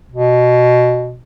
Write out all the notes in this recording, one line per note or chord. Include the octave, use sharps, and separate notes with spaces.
B2